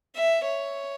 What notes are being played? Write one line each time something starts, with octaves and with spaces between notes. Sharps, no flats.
E5
C#5